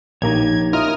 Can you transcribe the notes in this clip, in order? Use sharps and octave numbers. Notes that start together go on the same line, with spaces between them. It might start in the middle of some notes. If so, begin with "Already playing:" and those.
A#1 A#3 D#4 G4 C#5 A#5 G#6
E4 F4 A#4 D#5 D#6 F6